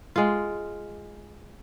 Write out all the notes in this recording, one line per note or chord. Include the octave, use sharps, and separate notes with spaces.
G#3 F4